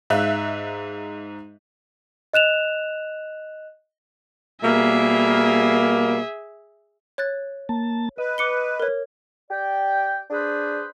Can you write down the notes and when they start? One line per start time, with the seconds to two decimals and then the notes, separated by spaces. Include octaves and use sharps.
0.10 G#2 E5 F5 F#6
2.34 D#5 F#6 E7 F7
4.62 B2 G3 A#3 G#4 E5
7.18 C#5 F#6 A6
7.69 A#3 A5
8.18 B4 D#5
8.38 D6 C#7 G7
8.80 A#4 C#5
9.51 G4 D5 G5
10.31 D4 G#4 B4 C5